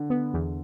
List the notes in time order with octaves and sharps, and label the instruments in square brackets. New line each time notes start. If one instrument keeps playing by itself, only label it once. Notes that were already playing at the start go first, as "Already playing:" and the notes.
Already playing: [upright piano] D3
[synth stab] B3
E2